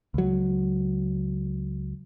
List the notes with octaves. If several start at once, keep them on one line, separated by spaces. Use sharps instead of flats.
C#2 F#3